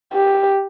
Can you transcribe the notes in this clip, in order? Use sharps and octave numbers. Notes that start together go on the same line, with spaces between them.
G4